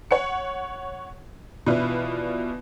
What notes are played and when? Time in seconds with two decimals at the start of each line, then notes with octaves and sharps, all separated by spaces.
0.11 C#5 F#5 C#7
1.67 B2 E3 D4 E4 F4 B4